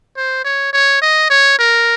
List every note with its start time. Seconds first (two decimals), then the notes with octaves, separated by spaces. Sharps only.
0.17 C5
0.44 C#5
0.73 C#5
1.02 D#5
1.30 C#5
1.59 A#4